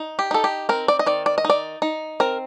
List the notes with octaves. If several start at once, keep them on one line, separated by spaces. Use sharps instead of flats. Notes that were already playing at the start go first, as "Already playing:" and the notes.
Already playing: D#4
G4
D#4 A4
G4
C4 A#4
D5
D#5
D#3 D5
D5
D#5
D#4
D5
D#4
C4 A#4